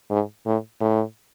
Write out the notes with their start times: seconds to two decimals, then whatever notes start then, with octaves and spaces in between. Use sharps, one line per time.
0.10 G#2
0.46 A2
0.80 A2